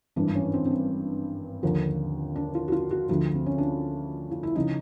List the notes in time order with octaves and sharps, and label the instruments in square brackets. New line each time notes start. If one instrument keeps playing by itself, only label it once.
[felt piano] G#1 G2 E3 D4
C#4
C4
C4
C#4
D#2 D3 F3
D4
F4
F#4
F4
F#4
D2 D3 F3 F4
C4
C#4
D4
F4
E4
C#3 F3 D#4